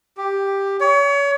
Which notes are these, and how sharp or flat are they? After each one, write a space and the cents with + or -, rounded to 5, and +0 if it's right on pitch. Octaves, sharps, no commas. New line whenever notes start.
G4 +5
C#5 +35